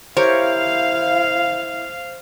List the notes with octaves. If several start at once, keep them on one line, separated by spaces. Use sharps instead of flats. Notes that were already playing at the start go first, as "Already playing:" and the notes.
E4 G4 A#4 C5 C#5 F5